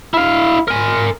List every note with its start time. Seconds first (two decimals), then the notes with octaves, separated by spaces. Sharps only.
0.14 E4 F5
0.68 A#4 G#5